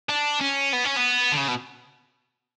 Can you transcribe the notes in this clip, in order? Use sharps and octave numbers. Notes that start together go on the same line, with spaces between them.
D4
C#4
B3
C#4
B3
D3
C#3
B2